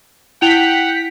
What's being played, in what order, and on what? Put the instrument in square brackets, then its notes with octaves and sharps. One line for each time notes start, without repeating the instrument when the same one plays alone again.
[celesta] E4 F7 [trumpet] F#5 [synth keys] G5 B6